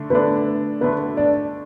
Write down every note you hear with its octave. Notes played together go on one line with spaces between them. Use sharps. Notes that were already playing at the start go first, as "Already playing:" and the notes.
Already playing: D3 A3 D4
D3 A3 B3 D4 B4
D3 A3 B3 D4 B4
D4 D5